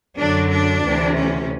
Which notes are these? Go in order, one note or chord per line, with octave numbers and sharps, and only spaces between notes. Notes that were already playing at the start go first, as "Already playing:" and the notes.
F#2 D3 F#3 D4
D4
D2 C3 E3
C#4